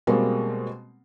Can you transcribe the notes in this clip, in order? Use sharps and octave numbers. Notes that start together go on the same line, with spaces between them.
B2 G3 G#3 A#3 C4